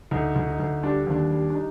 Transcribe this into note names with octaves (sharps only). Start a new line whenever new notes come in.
D2 D#4
D2
D#4
D2
G3 D4
D#2 D4
G3
D4
D#4